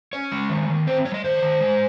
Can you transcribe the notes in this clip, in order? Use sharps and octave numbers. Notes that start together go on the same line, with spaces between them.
C#4 C#5
G#3
D#3
D#3
C4 C5
G3 C#5
D#5
D#3 C5
D#3
G#3